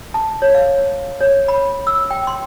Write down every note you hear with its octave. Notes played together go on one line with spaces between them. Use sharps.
A5
C#5
F5
C#5
B5
E6
G5
C6